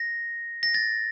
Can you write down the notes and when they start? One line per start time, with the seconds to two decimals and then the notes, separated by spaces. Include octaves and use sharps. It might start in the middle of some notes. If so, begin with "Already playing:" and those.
Already playing: A#6
0.63 A#6
0.74 A6